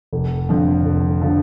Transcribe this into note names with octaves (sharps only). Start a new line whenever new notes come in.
F1
F2 D3 F3
F1
D3 F3